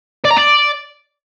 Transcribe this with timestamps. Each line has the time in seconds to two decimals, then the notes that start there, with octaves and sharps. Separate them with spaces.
0.25 D5
0.31 A#5
0.37 D5